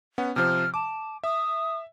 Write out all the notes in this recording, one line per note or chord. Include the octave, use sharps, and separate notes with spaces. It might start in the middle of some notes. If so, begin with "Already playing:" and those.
B3 C#4 F#5
C3 F3 C5 F6
A5 D6
E5 D#6